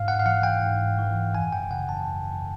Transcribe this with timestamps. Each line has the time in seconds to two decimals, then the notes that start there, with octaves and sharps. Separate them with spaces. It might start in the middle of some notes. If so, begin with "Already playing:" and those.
Already playing: G#2 F5
0.08 F#5
0.19 F5
0.26 E3 F#5
0.43 G5
0.62 G#2
0.98 E3
1.35 F#2 G#5
1.53 G5
1.71 C#3 E3 F#5
1.89 A5
2.07 F#2